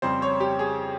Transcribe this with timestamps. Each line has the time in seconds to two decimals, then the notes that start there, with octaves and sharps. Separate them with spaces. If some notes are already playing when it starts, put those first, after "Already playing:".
0.02 F2 C#3 G3 C4 C5
0.22 C#5
0.40 G4
0.59 G#4